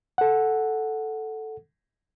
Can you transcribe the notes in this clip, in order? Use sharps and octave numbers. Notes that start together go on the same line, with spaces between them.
A4 F#5